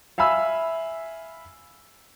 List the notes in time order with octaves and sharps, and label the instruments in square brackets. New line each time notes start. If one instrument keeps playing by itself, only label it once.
[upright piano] E5 F5 G#5 B5 E6